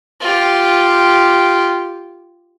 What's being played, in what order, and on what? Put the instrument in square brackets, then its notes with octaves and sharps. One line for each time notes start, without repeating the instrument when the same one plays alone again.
[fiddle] F4 G4